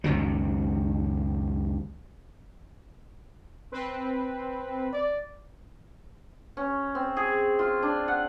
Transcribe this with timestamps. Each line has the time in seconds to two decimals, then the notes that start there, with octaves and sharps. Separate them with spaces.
0.04 C#2 F#2 D#3 F#3
3.72 C4 B4
4.93 D5
6.57 C#4
6.95 C4
7.17 G#4
7.59 F4
7.83 D4
8.08 F#5